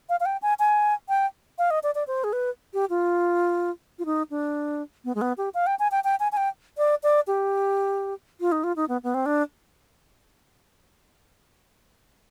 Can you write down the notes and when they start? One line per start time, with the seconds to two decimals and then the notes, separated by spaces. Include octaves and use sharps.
0.09 F5
0.20 F5
0.25 G5
0.42 G#5
0.59 G#5
1.09 G5
1.58 F5
1.70 D#5
1.83 D5
1.95 D5
2.07 C5
2.24 G#4
2.33 B4
2.74 G4
2.90 F4
3.99 F4
4.05 D#4
4.30 D4
5.05 B3
5.15 G#3
5.21 B3
5.38 G4
5.54 F5
5.66 G5
5.79 G#5
5.91 G5
6.04 G5
6.20 G#5
6.32 G#5
6.37 G5
6.78 D5
7.03 D5
7.27 G4
8.40 F4
8.52 D#4
8.64 F4
8.76 D#4
8.89 B3
9.03 B3
9.14 C4
9.26 D4